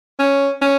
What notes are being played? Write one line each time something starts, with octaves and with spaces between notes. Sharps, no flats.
C#4
C#4